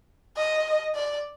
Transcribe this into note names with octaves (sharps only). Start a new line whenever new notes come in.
D#5
D5